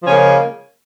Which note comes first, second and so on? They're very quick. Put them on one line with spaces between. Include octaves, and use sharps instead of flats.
F3 C#4 C#3 G#3 A#3